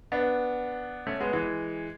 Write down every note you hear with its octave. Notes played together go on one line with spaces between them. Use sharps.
B3 D4
A3 C#4
G#3 B3
E3 G#3